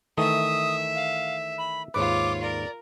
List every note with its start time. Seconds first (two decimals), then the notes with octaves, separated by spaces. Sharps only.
0.18 D#3 E3 A3 E5 D#6
0.96 F5
1.58 B5
1.94 D#2 G#2 F4 B4 C#5 D6
2.42 A#4 D5